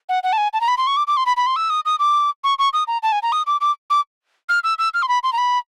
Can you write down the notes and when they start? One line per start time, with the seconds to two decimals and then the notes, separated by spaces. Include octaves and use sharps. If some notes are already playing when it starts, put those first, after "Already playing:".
0.09 F#5
0.23 F#5
0.33 A5
0.38 G#5
0.53 A5
0.61 A#5
0.68 B5
0.77 C6
0.87 C#6
0.97 D6
1.07 D6
1.17 C6
1.26 B5
1.37 B5
1.46 C6
1.56 E6
1.70 D#6
1.85 D#6
1.99 D6
2.44 C#6
2.59 C#6
2.73 D#6
2.87 A#5
3.03 A5
3.12 G#5
3.23 A#5
3.32 D#6
3.46 D6
3.61 D6
3.90 D6
4.49 F6
4.64 E6
4.78 E6
4.94 F6
5.02 C6
5.08 B5
5.23 C6
5.33 A#5
5.38 B5